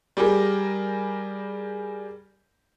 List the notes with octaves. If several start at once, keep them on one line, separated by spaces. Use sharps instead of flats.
G3 G4 G#4 A#4